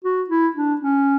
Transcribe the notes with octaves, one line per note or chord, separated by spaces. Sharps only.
F#4
E4
D4
C#4